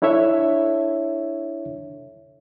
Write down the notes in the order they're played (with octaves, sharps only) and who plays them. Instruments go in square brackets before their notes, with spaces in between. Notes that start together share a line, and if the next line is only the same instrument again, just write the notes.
[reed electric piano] D4 E4 A4 C#5 E5